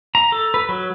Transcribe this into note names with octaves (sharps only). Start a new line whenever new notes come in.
A#5
A4
B4
F#3